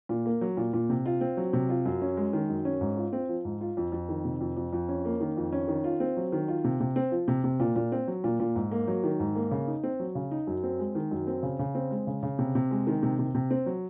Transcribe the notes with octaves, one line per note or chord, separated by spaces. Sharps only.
A#2
A#3
F#3
A#2
A#2
C3
F4
C4
F#3
C3
F4
F#2
C#4
G#3
D#3
F#2
C#4
G#2
F4
C4
F3
G#2
F4
F2
F2
D#3
C3
F2
F2
F2
C#4
A#3
D#3
F2
C#4
D#3
F4
C4
F#3
D#3
F4
C3
C3
C4
F3
C3
C3
A#2
A#2
C4
F#3
A#2
A#2
G#2
A#3
F#3
D#3
G#2
A#3
C#3
D#4
C4
F#3
C#3
D#4
F#2
C4
G#3
D#3
F#2
C4
C#3
C#3
C4
G#3
C#3
C#3
C3
C3
G#3
D#3
C3
C3
C3
C4
F#3